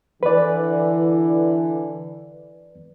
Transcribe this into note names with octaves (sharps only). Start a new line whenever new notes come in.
D3 E3 B4 D5